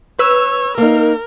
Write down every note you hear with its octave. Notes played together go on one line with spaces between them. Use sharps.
B4 C#5 E6
A#3 D#4 A#4